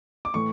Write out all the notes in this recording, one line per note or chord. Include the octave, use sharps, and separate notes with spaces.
D6
A2 E3 A3 C#6